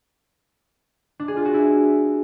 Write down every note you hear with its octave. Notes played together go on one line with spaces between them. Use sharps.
D4
G#4
F4
F#4
E4